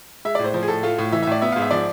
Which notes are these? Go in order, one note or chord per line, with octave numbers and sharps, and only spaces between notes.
G#3 E5
D5
A2 C5
F3 C5
G#4
A2 A4
A3 F4
A2
E3 E5
E5
A2 D5
B3 E5
G#2 F5
E5
F3 D5